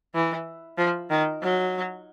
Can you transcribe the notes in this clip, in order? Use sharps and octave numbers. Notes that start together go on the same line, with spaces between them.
E3
F3
D#3
F#3